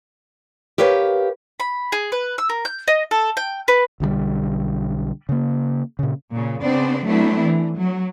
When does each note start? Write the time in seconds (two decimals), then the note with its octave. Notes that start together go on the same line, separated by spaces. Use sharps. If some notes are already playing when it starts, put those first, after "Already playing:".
0.78 G4 A#4 B4 C#5 F5
1.60 B5
1.92 G#4
2.12 B4
2.38 E6
2.50 A#4
2.65 G6
2.88 D#5
3.11 A4
3.37 G5
3.68 B4
4.00 B1 D3 E3 G3
5.29 C#3 A#3
5.99 A#2 C#3
6.33 A#2 C#3
6.63 C#3 B3 C4 D4 C5 D5
7.06 F#3 A3 B3 C4 D4 E4
7.41 E3
7.78 F#3